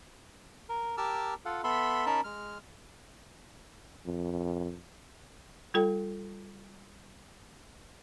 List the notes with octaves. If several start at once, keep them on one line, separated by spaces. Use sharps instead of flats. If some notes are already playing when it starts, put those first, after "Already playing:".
A#4
G4 A#4 A5 D6 E6 F6
F4 A4 F5 F#5
B3 A4 E5 B5 C6
C#4 D#4 A#4 A5 B5
G#3 F6
F2
G3 F4 A4 G5